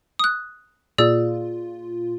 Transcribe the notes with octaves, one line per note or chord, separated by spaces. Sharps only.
D#6 F#6
A#2 F4 G#4 D5 E6